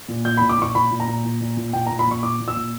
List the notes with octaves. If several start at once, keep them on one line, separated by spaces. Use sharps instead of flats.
A#2
A#2 G6
B5
A#2
D6
A#2 C#6
A#2 B5
A#2
A#5
A#2
A#2
A#2
A#2
A#2 G5
A#5
A#2
B5
A#2 C#6
A#2 D6
A#2
E6
A#2